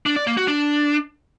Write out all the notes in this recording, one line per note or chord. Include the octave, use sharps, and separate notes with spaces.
D4
D5
A#3
F#4
D4